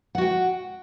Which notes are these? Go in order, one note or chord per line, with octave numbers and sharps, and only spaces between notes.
F#4 F#5 G5